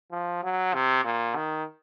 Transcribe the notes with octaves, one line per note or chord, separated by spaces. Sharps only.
F3
F#3
C3
A#2
D#3